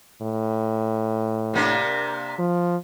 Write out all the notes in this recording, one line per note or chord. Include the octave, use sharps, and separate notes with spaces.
A2
C3 A#3 D4
F3